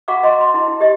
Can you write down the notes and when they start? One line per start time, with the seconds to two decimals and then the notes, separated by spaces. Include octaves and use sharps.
0.08 F#4 F5 F#5 A#5 C#6 D6
0.23 D#5 A#5 C6
0.41 C6
0.54 E4
0.68 E4
0.80 G4 D#5